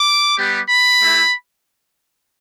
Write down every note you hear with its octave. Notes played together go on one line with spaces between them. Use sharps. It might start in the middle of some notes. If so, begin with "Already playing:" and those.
Already playing: D6
G3 B3 G4
B5
A3 E4 G4